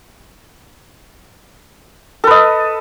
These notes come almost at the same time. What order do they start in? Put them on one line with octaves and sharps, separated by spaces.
A4 B4 D#5